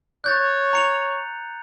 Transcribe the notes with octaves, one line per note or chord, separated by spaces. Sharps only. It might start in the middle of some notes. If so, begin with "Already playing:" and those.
C#5 F#6 G6 A6
A#5 C#7 F7